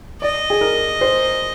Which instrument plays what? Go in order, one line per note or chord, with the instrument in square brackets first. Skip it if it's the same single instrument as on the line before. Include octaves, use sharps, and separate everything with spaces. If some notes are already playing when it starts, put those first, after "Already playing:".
[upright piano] D5 [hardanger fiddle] D#5
[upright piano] G#4
A#4
C5